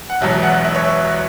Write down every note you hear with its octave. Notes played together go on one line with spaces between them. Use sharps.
F#5
E1 E2 B2 F#3 E5
F#5
E5
C#5
E5